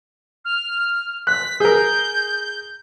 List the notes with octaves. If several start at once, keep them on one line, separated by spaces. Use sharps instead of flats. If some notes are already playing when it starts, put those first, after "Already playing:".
F6
F#6 B6
G#4 A#4 G6